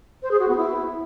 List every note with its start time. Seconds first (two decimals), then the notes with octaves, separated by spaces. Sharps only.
0.22 C5
0.31 G#4
0.40 F#4
0.48 B3
0.57 E4